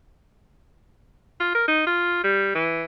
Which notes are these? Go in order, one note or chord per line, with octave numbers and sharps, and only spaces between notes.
F4
A#4
D#4
F4
G3
E3